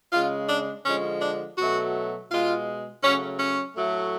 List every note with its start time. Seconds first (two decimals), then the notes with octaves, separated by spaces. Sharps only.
0.13 C#3 G#3 F4
0.49 D4
0.86 D3 F3 G#3 C#4
1.22 D4
1.58 B2 F#3 A3 F#4
2.30 B2 G#3 F4
3.03 C#3 F#3 A3 C#4
3.40 C#4
3.76 A2 F#3 A3